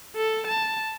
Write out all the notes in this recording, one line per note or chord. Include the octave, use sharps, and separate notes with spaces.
A4
A5